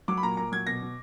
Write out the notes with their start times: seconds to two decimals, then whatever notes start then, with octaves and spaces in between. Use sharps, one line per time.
0.08 F#3 D6
0.17 B5
0.23 A#2 A#5
0.37 A#2 A#5
0.52 F#3 G#6
0.67 B2 A#6
0.82 B2